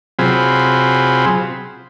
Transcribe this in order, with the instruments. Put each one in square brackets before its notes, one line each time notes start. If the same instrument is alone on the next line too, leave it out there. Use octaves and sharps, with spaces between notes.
[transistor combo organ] C3 F#3 C4 F4 G#4 B5